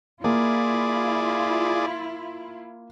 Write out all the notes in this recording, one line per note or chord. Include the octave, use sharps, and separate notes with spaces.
A#3 E4 F4 G#4 D5